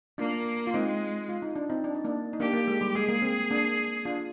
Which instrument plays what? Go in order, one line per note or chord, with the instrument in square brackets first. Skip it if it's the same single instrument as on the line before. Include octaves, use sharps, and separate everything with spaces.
[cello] A#3 [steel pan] D4 F4
[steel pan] F4
[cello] G#3 [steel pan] C4 D#4
[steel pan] F4
D#4
D4
C4 D#4
D4
D#4
A#3 D4
D#4
[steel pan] A#3 D4 [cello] G4
[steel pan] A#3
G#3
G3
[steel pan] G#3 [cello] G#4
[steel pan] A#3
C4
A#3 D4
D4 F4